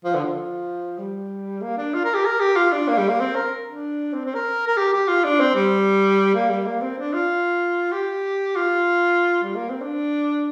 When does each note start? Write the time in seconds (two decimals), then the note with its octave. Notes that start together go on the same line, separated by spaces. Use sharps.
0.05 F3
0.15 D3
0.25 F3
0.99 G3
1.62 A#3
1.78 D4
1.94 F4
2.04 A#4
2.14 G4
2.25 A#4
2.40 G4
2.56 F4
2.73 D4
2.89 A#3
2.98 G3
3.09 A#3
3.20 C4
3.35 A#4
3.67 D4
4.13 C4
4.25 C4
4.34 A#4
4.68 A#4
4.77 G4
4.93 G4
5.08 F4
5.24 D4
5.40 C4
5.55 G3
6.35 A#3
6.50 G3
6.66 A#3
6.82 C4
6.98 D4
7.14 F4
7.92 G4
8.56 F4
9.43 G3
9.55 A#3
9.69 C4
9.81 D4